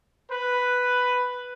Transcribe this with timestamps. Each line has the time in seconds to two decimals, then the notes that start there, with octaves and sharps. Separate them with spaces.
0.32 B4